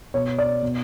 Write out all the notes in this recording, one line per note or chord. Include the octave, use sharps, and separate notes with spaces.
B2 C#5
D5
B2